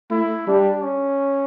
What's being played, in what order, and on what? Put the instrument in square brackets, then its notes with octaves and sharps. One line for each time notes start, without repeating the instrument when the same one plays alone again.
[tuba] A3 [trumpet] E4
[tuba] G3 [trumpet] D4
[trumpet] C#4